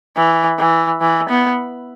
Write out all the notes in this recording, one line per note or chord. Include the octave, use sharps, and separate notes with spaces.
E3
E3
E3
B3